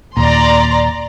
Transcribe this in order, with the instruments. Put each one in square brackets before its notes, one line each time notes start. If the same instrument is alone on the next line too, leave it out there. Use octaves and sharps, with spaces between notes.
[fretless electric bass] D#2 A#2 [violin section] D5 A#5 C6